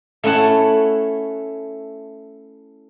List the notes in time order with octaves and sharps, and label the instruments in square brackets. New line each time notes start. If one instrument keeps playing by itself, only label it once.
[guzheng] A3 C#4 E4 F#5 A5